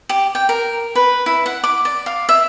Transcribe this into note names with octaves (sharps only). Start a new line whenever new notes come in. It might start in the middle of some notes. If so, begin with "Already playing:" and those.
G4
G5
A#4
B4
E4
F#5
D6
D5
F5
E5